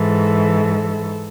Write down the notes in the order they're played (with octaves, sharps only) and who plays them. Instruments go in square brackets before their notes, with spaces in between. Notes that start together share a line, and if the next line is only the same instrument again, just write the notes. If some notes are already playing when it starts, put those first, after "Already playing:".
Already playing: [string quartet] G#2 E3 A4